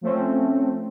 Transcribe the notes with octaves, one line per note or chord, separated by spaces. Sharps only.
F3 A3 C4 C#4